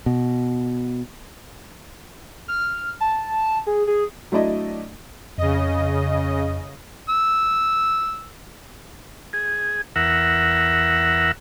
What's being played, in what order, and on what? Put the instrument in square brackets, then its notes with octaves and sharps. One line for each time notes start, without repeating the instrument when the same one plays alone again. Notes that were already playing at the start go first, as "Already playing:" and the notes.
[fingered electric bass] B2
[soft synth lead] F6
A5
G#4
G#4
[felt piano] F#3 A3 D4 E4 D5 D#5
[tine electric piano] F2 [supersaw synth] C#3 D#5
[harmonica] E6
[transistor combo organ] G#4
E2 A#4 E5 F#5